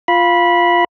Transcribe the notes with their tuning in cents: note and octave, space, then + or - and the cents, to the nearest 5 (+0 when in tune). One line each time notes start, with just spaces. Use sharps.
F4 +0 F5 +0 B5 -15